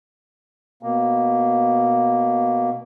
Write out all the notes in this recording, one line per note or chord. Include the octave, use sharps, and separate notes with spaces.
B2 A#3